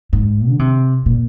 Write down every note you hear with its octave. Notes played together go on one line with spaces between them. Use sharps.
G#2
D3
C3
A#2